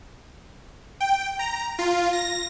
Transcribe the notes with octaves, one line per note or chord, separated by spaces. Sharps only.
G5
A#5
F4
A#6